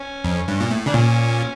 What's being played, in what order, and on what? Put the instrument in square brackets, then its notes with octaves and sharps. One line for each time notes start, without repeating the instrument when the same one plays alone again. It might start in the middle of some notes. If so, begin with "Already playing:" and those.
Already playing: [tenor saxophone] C#4
[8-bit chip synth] F2
G2
A#2
A2
[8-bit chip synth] C#3 [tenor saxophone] D4
[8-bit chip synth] A#2 [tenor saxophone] C#4